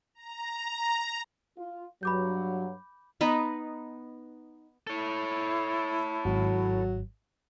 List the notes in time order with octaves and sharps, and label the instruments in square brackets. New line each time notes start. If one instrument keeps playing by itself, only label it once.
[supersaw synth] A#5
[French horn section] F4
[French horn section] G2 F#3 [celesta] B5 D6 G6
[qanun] B3 D#4 B4
[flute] E4 [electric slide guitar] A4 C#5
[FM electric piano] G#1 [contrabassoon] F#3